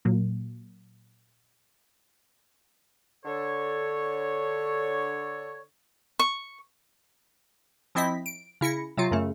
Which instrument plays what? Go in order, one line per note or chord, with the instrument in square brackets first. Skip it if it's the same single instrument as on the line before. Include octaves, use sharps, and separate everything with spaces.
[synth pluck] A#2 F#3 A#3
[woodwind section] D3 A4 C#5
[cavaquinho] C#6
[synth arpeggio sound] F3 C4 E4 D#5 B6
D7
C#3 E4 A#6 C#7
C3 F#3 F4
F#2 C#3 A3